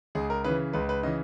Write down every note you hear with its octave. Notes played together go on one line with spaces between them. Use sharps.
C#2 G#4
A#4
C#3 E3 B4
C#2 B4
B4
C#3 E3 D#5